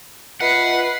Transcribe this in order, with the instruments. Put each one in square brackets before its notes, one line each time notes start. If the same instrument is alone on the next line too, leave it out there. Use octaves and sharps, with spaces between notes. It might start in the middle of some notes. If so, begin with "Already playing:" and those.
[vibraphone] F4 D#5 E5 [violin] B4 C7 [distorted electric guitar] F#5